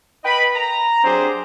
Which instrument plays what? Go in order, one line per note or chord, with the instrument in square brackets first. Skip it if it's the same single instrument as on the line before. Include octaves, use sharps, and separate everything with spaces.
[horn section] B4 D#5 G5 B5
A#5
F#3 C4 D4 G4 G#4 C5